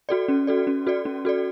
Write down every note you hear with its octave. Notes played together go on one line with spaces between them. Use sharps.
F#4 A4 D5
C#4
F#4 A4 D5
C#4
F#4 A4 D5
C#4
F#4 A4 D5